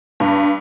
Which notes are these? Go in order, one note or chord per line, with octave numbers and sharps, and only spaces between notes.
G2